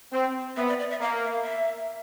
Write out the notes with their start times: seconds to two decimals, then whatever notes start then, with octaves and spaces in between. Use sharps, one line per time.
0.12 C4
0.56 B3 E5
0.68 D5
0.79 D5
0.91 E5
1.01 A#3 F5
1.24 E5
1.32 F5
1.43 E5